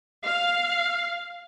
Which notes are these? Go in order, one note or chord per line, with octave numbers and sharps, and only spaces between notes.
F5